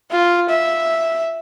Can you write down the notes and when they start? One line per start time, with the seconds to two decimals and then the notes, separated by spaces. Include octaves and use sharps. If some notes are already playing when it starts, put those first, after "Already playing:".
0.11 F4
0.49 E5